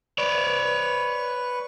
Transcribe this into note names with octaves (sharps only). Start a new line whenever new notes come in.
B4 C#5 D5 C#6